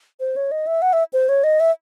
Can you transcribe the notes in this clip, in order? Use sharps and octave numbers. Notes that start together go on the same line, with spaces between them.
C5
C#5
D#5
E5
F#5
E5
C5
C#5
D#5
E5